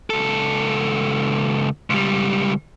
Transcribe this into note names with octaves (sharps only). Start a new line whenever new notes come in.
C#2 A4
C#2 G3